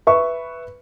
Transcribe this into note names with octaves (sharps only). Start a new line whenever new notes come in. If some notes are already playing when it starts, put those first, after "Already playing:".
B4 E5 C#6